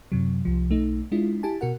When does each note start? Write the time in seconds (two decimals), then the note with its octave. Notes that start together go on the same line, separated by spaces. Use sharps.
0.12 F#2 C3 F#3
0.45 C2 F3
0.70 B1 A3 D#4
1.12 G#3 D4 E4 F4
1.43 E4 G4 G#5 A5
1.61 B2 F#4 A#4 F#5